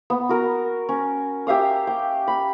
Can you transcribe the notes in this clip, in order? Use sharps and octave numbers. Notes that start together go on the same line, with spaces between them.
B3
F#4 A#4
C#4
G4 E5 F5 D#6
G5
B5